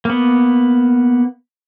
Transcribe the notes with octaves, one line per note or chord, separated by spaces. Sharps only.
A#3 B3